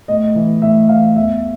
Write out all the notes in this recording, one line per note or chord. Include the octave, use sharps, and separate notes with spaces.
A2 D#5
E3
A2 E5
E3 F5
E2 E5